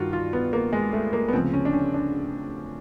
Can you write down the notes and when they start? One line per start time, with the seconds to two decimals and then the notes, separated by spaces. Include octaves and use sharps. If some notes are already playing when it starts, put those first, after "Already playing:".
Already playing: G2 D#3 F4 F#4
0.13 F4
0.33 B3
0.53 A#3
0.73 G#3
0.93 A3
1.13 A#3
1.28 B3
1.33 D2 C#3 F3 C4
1.54 C#4
1.65 D4
1.73 C#4
1.94 D4